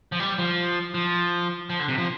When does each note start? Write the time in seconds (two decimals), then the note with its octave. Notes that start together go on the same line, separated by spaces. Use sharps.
0.12 F3
0.20 G3
0.38 F3
0.94 F3
1.70 F3
1.79 D3
1.88 C3
1.98 F3